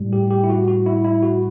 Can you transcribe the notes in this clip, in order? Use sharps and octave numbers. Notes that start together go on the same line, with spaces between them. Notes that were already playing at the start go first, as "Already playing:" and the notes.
Already playing: A2 G3
G4
G4
E4
F#4
F#4
E4
E4
F#4